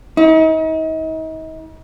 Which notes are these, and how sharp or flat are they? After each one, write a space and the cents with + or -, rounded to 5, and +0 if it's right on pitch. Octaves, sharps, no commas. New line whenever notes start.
D#4 +40